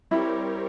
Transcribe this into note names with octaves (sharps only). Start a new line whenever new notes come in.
G3 C4 E4 G4 A#4 C#5